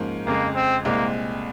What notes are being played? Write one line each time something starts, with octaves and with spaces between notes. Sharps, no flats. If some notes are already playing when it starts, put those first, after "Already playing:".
Already playing: G#2 F3 A#3 C#4
F2 C#3 G#3 A#3
C4
C2 A#2 G#3 A#3 C4